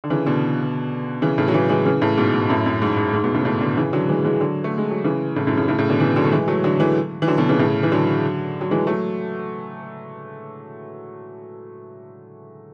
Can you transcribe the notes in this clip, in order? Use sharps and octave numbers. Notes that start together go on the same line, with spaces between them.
D3
C#3 E3
B2 D3
C#3 E3
A2 C#3
F#3
C#3 E3
E3 G#3
C#3 E3
A2 C#3
G#2 B2
G#2
F#2 A2
F#2
G#2
G#2
G#2
G#2 B2
A2 C#3
A2 C#3
B2 D3
C#3 E3
D3 F#3
E3 G#3
E3 G#3
D3 F#3
A3
G#3
F#3
C#3 E3
A2 C#3
F#2 A2
A2 C#3
A2 C#3
A2 C#3
B2 D3
C#3 E3
D3 F#3
A3
E3 G#3
F#3 A3
D3 F#3
E3 G#3
E3
D3 F#3
B2 D3
C#3 E3
A2 C#3
E3
D3 F#3
F#3
E3 G#3
F#3 A3